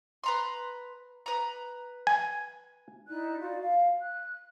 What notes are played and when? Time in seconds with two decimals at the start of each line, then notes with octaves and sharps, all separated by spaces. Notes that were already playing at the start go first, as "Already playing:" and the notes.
0.24 B4 A#5 C6
1.26 B4 A#5
2.07 G#5
3.07 D#4 E4 D5 F#6
3.38 F4 F#4 D5
3.60 F5
4.00 F#6